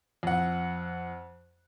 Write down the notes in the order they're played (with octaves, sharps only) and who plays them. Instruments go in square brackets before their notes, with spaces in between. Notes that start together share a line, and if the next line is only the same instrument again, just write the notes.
[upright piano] F2 F#5